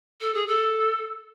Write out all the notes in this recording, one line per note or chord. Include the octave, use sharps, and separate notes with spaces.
A4
G#4
A4